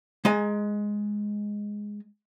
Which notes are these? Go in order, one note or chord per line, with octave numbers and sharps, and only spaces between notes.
G#3 G#5 A#5